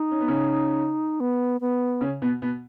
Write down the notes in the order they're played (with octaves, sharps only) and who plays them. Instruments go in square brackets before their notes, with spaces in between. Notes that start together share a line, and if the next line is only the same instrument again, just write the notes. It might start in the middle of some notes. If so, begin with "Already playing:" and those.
Already playing: [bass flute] D#4
[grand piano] C#4
B3
C#3 C#4
[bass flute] B3
B3
[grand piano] C#3 C#4
B2 B3
B2 B3